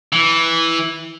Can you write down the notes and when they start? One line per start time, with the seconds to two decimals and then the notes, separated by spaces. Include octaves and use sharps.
0.12 E3